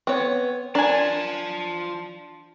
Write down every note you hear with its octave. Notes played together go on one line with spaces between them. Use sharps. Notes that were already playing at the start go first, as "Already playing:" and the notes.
B3 C4 C#5
D4 F4 A#4 G#5 A5